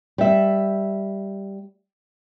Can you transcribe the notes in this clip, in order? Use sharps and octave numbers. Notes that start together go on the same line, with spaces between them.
G3 E5